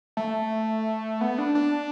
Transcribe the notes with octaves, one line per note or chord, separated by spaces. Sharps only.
A3
B3
D4
D4